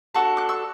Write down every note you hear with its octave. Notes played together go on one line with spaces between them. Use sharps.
D4 F#4 A4 A5 C#6
D6 F#6
C#6 E6